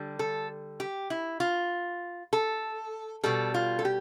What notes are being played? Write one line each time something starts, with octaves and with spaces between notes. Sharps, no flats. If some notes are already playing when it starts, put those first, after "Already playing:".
Already playing: D3 G3
A4
G4
E4
F4
A4
B2 G3 A4
F4
A4
G4